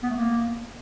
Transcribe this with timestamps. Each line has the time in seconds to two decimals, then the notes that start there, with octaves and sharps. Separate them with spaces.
0.03 B3
0.10 A3
0.17 A#3